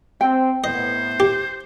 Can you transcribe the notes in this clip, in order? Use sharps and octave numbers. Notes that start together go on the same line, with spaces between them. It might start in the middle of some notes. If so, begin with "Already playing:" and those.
C4 G5
A2 B3 C5 D#5
G4